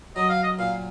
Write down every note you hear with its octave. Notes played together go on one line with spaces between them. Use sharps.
F#3 D#5
F5
D#5
A#2 F5